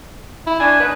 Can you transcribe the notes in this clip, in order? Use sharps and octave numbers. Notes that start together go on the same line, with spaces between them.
E4
E3 A3 D4 G#5
D4 D#4 B4